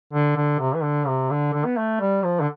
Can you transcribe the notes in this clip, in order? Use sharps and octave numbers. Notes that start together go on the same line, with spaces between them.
D3
D3
C3
E3
D3
C3
D3
D3
B3
A3
G3
F3
D3